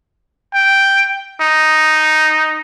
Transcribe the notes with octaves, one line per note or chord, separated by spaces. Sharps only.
G5
D#4